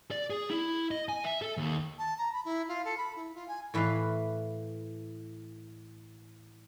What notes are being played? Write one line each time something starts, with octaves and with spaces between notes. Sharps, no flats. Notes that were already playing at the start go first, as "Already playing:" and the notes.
D5
G#4
E4
D#5
G#5
E5
A4
D#2
A5
A#5
B5
E4
F4
A4
B5
E4
F4
G#5
A2 E3 B4 E5 F5